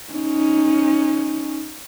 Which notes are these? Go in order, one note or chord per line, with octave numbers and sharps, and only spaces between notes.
C#4 D#4